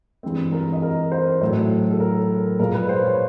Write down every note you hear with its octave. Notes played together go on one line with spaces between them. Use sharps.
G2 E3 G#3 C4
A#4
D#5
A#4
C5
A2 F#3 A3
A4
A#4
A#2 F3 G#3 A#4
B4
C5
C#5